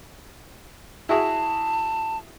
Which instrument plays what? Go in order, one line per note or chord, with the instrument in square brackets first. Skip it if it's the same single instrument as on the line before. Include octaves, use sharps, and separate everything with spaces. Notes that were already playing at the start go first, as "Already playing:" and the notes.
[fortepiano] E4 F#4 G#4 [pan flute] A5